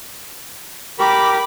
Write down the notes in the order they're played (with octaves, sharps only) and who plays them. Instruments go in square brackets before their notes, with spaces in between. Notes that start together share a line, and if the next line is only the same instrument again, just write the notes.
[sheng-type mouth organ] G4 A#4 [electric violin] B5 D6